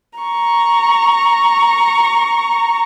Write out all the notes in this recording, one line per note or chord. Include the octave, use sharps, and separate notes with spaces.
A#5 C#6